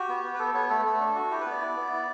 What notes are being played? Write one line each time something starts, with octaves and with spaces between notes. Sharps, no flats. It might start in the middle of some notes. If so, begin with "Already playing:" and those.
Already playing: F#4 G4
B3
B3
B4
B3 A4
B3 C#5
A3 A4
A3
D4
F#4
E4 G4
B3 B4
D5
E4
B3
E4